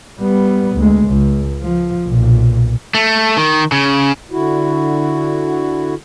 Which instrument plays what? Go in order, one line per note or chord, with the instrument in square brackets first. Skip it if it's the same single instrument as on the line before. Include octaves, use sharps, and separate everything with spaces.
[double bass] G3 B3
D2 G#3
C#2
F3
B1 A#2
[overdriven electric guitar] A3
D#3
C#3
[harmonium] D3 E4 F#4